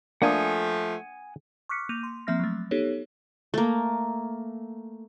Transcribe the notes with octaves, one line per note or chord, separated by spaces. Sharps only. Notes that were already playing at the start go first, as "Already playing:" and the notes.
F3 A3 A#3 D4 F#5 G#5 D#6
C#6 D6 F6 F#6 B6 C#7
A#3 D6 G6 D#7 F7
C6
F3 A#3 C4 E5 F6 A#6
F#3 A3
B3 D#4 G4 A4 C#5
A3 A#3